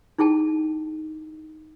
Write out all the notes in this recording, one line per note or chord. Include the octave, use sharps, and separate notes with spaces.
D#4 E4 G#4 G5 A5